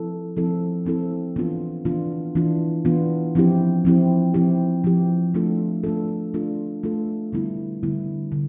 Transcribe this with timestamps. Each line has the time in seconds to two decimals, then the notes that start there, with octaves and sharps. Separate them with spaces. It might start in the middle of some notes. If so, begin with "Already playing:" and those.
Already playing: F3 C4 E4 A4
0.37 F3 C4 E4 A4
0.85 F3 C4 E4 A4
1.36 E3 B3 D4 F4
1.85 E3 B3 D4 F4
2.35 E3 B3 D4 F4
2.85 E3 B3 D4 F4
3.35 F3 C4 E4 G4
3.85 F3 C4 E4 G4
4.34 F3 C4 E4 G4
4.84 F3 C4 E4 G4
5.34 A3 D4 F4 A4
5.84 A3 D4 F4 A4
6.34 A3 D4 F4 A4
6.83 A3 D4 F4 A4
7.33 D3 G3 B3 E4
7.83 D3 G3 B3 E4
8.32 D3